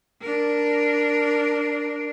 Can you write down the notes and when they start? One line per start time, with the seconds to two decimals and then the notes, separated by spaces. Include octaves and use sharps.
0.21 D4 A#4